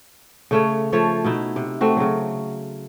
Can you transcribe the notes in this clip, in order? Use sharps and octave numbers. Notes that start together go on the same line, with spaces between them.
C#3 A3 C#5
F3 A3 C#5
B2 D#4 E4
C3
A3 C4 F#4
C#3 F#3